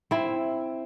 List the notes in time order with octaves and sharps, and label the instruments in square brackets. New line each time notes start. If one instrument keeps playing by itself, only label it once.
[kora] C4 E4